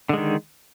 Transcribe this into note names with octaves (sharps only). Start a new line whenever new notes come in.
D3 D#3 G#3